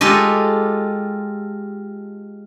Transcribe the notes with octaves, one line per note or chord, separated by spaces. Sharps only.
G#3 F4 G4 A4 D#5